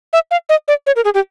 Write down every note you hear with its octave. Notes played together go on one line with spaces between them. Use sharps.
E5
F5
D#5
D5
C#5
A#4
G#4
G4